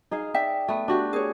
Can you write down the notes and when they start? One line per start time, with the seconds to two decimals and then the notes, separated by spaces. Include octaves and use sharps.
0.11 D#4 G#4 F5
0.34 D5 E5 G5
0.68 A3 B3
0.88 D4 F#4 G4
1.13 G#4 C#5